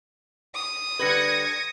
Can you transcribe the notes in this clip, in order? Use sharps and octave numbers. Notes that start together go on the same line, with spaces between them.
D#6
D3 G3 B4 G#6 A#6 C#7